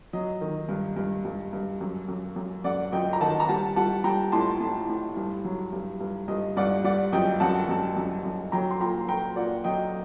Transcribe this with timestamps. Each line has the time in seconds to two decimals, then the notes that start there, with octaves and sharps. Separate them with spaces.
0.13 F#3 D#5
0.41 D#3
0.69 G2
0.97 G2
1.25 G2
1.53 G2
1.81 F#2
2.08 F#2
2.36 F#2
2.64 F#2 D5 F#5
2.92 F#2 D#5 G5
3.13 A#5
3.21 D#3 F#5 A5
3.40 A#5
3.48 G3 F#5 A5
3.76 G3 F#5 A5
4.04 G3 G5 A#5
4.32 A2 A5 C6
4.61 A2
4.89 A2
5.17 G2
5.45 F#3
5.73 G2
6.01 G2
6.28 G2 D#5
6.57 G2 D5 F#5
6.84 G3 D5 F#5
7.12 F#2 D#5 G5
7.40 F#2 F#5 A5
7.69 F#2
7.97 F#2
8.25 F#2
8.52 F#3 G5 A#5
8.71 C6
8.80 A#2 G5 A#5
9.08 F#3 G5 A#5
9.36 A#2 D5 F#5
9.64 F#3 D#5 G5